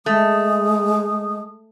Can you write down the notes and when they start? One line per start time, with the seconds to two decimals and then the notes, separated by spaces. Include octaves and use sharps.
0.06 G#3 A3 D#6